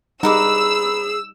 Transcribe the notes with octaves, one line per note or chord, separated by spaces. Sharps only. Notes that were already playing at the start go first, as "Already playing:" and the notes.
G3 D#4 G#4 A#4 B4 F#5 D6 E6